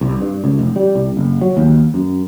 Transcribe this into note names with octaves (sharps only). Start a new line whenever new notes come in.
C2
G2
C#2
F1
G3
C2
F#1
F#3
D#2
F#2